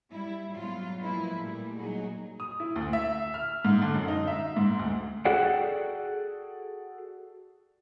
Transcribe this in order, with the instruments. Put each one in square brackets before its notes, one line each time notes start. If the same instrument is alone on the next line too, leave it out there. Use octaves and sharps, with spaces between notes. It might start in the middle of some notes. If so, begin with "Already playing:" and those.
[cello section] G3 E4
G#2 B2 F#3 F4
F3 G#3 A#3 E4 B4
A#2 G3 A3
F#3 D#4 F#4 G#4
[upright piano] D#6
E4
D2
E5
F6
G#2
D3
F#2
D#4
E5
G#2
D2
[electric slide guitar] F#4 G#4 A4 D5 F#5 G5